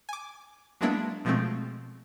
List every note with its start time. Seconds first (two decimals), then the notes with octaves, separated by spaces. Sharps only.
0.09 G#5 D6
0.81 F#3 G#3 A#3 B3 D4 E4
1.25 B2 F3 G#3 A3 C4